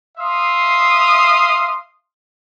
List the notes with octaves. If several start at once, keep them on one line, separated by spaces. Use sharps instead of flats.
E5 F5 C6 D#6